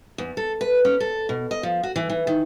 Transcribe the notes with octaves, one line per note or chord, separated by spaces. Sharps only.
E2
A4
B4
C#4
A4
B2
D#5
F3
F#4
E3
E3
D#3